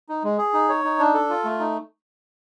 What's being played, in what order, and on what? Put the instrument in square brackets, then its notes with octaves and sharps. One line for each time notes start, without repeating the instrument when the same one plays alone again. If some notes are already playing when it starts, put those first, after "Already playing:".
[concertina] D#4
G#3
G#4
D#4
C#5
D#4
D4
A4
F4
A3
D#4